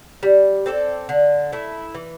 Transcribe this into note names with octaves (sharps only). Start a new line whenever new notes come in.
G3
C4 A4 D5
D3
A3 E4
E3